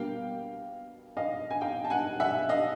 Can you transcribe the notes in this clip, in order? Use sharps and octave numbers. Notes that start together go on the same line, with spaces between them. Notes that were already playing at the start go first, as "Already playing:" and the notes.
Already playing: B2 G3 A#3 D4 F5 G5
D#5 F5
G#5
F5 G5
A5
F#5 G#5
E5 F#5
D#5 F5